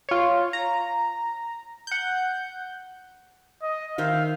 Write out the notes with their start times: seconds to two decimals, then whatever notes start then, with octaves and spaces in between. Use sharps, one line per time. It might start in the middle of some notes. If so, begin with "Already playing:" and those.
0.09 F4 C#5
0.53 A#5
1.87 F#5 G6
3.62 D#5
3.98 D#3 C5 E5 F5